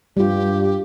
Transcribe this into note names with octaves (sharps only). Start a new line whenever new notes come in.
G2 G3 F4 G4